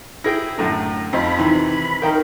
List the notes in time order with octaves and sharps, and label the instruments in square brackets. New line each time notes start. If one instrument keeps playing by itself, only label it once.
[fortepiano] E4 G#4 G5 [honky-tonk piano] A#6
[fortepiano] F#2 A2 D3
[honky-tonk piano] F2 [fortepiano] C4 D#4 F4 [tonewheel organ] B5
[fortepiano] C3 [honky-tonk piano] D#3 E3
[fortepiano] D#3 G5 [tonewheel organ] A#4